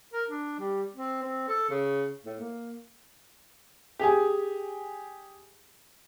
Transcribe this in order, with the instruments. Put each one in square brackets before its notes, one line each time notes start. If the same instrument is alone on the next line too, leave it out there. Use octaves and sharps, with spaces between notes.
[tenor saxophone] A#4
D4
G3
C4
C4
A4
C#3
A2
A#3
[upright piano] G4 G#4 G#5